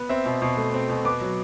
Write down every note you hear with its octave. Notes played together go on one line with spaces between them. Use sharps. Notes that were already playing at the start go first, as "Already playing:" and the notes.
Already playing: B3
C4 E5
B2
B2
A3
C4
B2
B3 D6
F#3